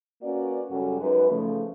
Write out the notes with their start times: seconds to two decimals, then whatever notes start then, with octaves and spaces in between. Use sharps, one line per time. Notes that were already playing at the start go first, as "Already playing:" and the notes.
0.22 A#3 C#4 F#4 B4 D5
0.70 F#2 C#3 G3 C#4 F#4 A4
1.01 F#2 G#3 D#4 B4
1.30 C#3 F3 A3